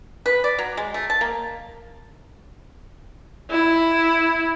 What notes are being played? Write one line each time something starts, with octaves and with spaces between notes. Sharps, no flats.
B4
D5
F#3
G#3
A3
A5
A#3
E4